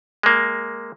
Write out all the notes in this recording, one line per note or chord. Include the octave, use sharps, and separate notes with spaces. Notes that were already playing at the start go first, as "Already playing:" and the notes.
G#3 A#3